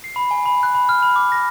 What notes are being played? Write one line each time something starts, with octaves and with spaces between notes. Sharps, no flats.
C7
B5
G#5
B5
F#6
B5
F6
B5
D6
A#6